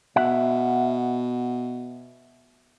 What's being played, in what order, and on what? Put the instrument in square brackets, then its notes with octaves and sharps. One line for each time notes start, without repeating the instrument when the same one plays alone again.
[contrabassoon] B2 [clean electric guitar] E5 F#5